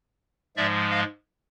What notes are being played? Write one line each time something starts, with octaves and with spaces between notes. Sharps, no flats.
G#2 F3 G#3 D5 E5
D#5 F5